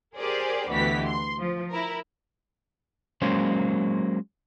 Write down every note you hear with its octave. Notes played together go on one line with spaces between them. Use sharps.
G4 G#4 A#4 C5 D5
D2 B2 E3 G4 B6
C6
F3
E4 A#4
F#3 G#3 A#3 C#4 C5